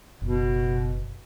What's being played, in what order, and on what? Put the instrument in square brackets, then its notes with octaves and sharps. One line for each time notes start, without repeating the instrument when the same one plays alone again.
[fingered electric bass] F#1 [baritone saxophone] B2